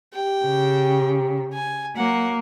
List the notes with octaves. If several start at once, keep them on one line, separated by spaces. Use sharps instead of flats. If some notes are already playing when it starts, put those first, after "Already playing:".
G4 G5
C#3
G#5
F#3 A#3 F#5